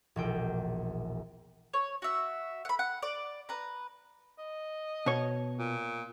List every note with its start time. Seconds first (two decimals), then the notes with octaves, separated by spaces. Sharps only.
0.16 E1 A#1 G5
1.73 C#5
2.02 F#4 E5
2.65 F#5 B5
2.79 F#5
3.02 D5
3.49 B4 A#5
4.38 D#5
5.06 B2 C#5
5.58 A#2